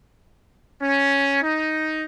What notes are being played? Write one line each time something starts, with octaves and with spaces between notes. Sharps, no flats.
C#4
D#4